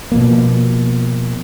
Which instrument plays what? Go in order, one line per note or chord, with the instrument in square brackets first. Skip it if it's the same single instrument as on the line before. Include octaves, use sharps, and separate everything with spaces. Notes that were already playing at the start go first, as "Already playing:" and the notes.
[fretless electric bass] B2 F3 A#3